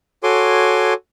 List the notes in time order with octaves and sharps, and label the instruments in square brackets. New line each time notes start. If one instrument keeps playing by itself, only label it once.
[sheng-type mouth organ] F#4 A4 C#5 G#5 C6 D6